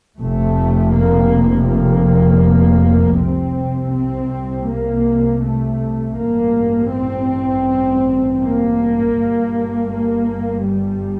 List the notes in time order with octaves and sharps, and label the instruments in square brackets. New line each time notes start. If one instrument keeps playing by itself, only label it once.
[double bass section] F1 F2 C3 A3
A#3
A#3
C2 C3 C4
C4
A#3
A3
A1 G2 A#3
C4
A#3
G1 G2
A#3
G3